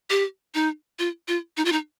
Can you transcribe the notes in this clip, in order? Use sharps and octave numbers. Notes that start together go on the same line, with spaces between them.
G4
D#4
F4
F4
D#4
F4
D#4